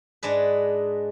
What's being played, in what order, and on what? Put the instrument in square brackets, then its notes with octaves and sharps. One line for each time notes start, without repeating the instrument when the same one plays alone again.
[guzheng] G#2 G#3 D4 B4